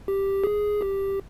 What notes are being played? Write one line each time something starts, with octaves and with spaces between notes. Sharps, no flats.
G4
G#4
G4